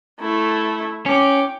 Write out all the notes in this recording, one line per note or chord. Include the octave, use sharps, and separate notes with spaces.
A3 E4
C#4 G5 D6